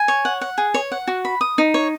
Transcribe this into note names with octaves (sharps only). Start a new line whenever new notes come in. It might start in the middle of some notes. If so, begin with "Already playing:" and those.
Already playing: G#5
C#5
F#5
F#5
G#4
C#5
F#5
F#4
B5
D#6
D#4
C#5